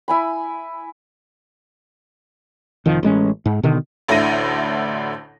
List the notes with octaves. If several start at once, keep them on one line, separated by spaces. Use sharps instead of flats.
E4 G#5 B5
F1 D#3 F3
A1 G#3 C#4
G#2
B2 D3 D#3
A1 D2 D3 E4 A#6 D#7